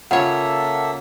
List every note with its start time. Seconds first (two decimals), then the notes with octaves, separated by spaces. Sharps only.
0.11 C#3 A#3 F4 A4 C#5 E5 F#5